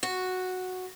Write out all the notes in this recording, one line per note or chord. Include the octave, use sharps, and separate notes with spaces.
F#4